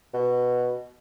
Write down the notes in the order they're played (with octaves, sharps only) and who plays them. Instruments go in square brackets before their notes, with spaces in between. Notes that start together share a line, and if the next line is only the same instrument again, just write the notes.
[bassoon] B2